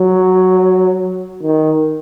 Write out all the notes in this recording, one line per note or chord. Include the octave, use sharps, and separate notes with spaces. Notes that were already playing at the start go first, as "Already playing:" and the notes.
Already playing: F#3
D#3